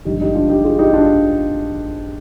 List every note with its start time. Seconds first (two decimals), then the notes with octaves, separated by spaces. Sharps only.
0.05 G#1 G2 D3 F3 D#4 G4
0.21 D#4 G4
0.35 D4 F4
0.49 D#4 G4
0.64 F4 G#4
0.78 D#4 G4
0.93 D4 F4